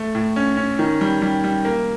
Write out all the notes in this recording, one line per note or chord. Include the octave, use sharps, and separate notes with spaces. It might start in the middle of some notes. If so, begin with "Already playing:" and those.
Already playing: A3
A2
C#4
C#4
D#3
G3
G3
G3
A#3